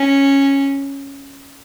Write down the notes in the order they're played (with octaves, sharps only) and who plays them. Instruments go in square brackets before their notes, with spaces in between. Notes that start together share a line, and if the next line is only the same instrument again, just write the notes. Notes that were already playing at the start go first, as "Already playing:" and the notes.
Already playing: [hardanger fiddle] C#4